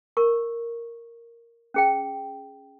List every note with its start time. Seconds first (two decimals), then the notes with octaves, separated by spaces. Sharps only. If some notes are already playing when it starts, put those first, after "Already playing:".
0.17 A#4 C#6
1.74 C#4 G#4 G5